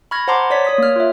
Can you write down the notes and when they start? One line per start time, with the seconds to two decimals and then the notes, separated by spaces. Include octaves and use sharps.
0.11 B5 C#6 F6 G#6 A#6
0.28 C5 F#5 A5 A#5 C6 D6
0.50 C#5 D5 B6
0.65 C#5 D#6 B6
0.78 A#3 F6
0.96 F4 E5